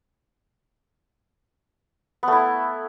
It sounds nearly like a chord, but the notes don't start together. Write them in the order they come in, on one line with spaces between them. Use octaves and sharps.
B3 A3 E4